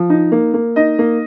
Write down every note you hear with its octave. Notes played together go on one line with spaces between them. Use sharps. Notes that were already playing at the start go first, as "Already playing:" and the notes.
Already playing: F3
D#4
A#3
A#3
D#4 D#5
A#3